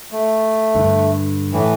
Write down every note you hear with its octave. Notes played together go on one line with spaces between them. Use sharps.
A3
G2 D3
A2 E3